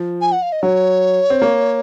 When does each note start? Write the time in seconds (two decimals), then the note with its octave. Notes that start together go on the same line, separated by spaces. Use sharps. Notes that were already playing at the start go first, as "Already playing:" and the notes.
Already playing: F3
0.21 G#5
0.32 F#5
0.42 F5
0.52 D#5
0.62 F#3 C#5
1.30 C4
1.42 A#3